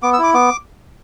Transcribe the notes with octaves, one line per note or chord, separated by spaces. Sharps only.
B3 D6
E6
E4 D6
B3 D6